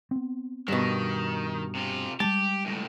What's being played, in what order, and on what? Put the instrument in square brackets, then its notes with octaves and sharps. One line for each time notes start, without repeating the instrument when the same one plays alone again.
[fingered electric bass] B3 C4
[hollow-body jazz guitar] G2 B2 [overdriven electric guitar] D#3
[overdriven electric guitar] C3 F4
[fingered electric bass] G3 G#3 [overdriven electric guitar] G4 [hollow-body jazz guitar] A5
[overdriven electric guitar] C#2 A2